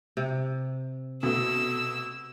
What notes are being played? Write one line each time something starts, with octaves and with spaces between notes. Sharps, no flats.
C3
B2 A3 E6